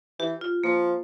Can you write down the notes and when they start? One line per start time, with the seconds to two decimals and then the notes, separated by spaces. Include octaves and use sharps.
0.19 E3 G4
0.41 F4
0.64 F3 A#3